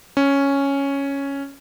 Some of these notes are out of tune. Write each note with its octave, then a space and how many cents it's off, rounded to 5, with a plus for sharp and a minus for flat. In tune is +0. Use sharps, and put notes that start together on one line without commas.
C#4 +0